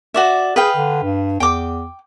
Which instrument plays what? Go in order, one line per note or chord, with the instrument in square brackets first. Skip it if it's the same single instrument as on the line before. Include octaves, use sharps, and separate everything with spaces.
[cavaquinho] F#4 D5 E5
[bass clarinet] G#4 [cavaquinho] B4 F5 G5
[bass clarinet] D3
G2
[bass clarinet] E2 [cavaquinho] G5 D6